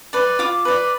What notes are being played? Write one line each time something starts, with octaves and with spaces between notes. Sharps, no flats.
B4 D5
F4 D6
B4 D5